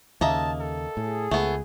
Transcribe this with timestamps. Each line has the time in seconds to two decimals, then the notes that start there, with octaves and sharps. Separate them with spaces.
0.21 D#2 C#3 A#3 D#5 E5 A5
0.60 A4
0.97 A2 G#4
1.31 C#2 A3 B3